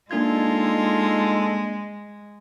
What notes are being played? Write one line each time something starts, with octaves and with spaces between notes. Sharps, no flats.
G#3 A#3 D4 D#4 F4 A4 G#6